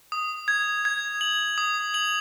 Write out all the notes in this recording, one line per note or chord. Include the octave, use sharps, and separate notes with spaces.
D#6
G#6
G#6
F#7
D#6
F#7